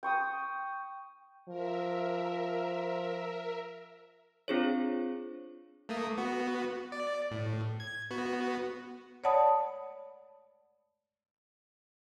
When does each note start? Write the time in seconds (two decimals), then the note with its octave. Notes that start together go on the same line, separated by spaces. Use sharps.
0.03 G5 C#6 D#6
1.49 F3 A#4 E5
4.48 C4 D4 F4 G#4 C5 C#5
5.89 A3 A#3 D#6
6.17 B3 F#4
6.92 D5
7.31 A2
7.80 G#6
8.11 B3 F#4
9.24 C#5 D5 F#5 A5 B5 D#6